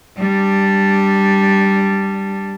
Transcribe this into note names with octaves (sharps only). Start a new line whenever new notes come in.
G3 D4